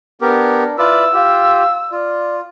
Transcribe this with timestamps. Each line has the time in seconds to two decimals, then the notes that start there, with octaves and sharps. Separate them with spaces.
0.22 B3 D4 G4 A#4
0.79 E4 F4 B4 D5 E6
1.14 F4 G4 F5
1.92 F4 D5